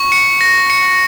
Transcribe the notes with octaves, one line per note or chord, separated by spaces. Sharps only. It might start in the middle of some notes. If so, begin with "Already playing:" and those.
Already playing: C#6
C#7
A#6
C#7